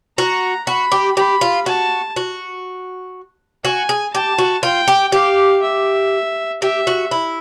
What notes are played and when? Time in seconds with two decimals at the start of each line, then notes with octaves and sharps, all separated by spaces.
0.17 F#4 A#5
0.67 F#4 B5
0.92 G4
1.16 G4 B5
1.41 F4
1.66 F#4 A5
2.16 F#4
3.64 F#4 G#5
3.89 G#4
4.13 G4 A5
4.38 F#4
4.63 F4 G5
4.88 G4
5.12 G4 F5
5.62 E5
6.62 G4 E5
6.87 F#4
7.11 E4